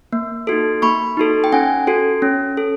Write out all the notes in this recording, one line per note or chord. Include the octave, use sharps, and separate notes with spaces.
A#3
D#4 F#4 A4
A#3 B5 C#6
D#4 F#4 A4
G5
C#4 F#5 G#5
F#4 A4
C#4
A4